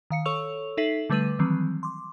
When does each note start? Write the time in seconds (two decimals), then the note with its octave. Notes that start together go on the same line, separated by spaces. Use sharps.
0.10 D#3 F5 C#7
0.26 A4 C#5 C#6 E6 F7
0.77 D#4 A4 E5 B6 C7 F#7
1.10 D3 G3 A3 B4 D6 D#7
1.39 D#3 E3 F#3 G3 C4
1.83 C6 D6